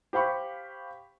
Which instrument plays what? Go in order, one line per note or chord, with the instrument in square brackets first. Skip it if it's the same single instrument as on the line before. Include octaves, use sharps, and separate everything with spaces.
[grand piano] G4 C5 F5 B5 C#6